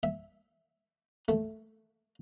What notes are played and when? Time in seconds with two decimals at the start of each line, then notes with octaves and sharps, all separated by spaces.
0.03 E5
1.28 A3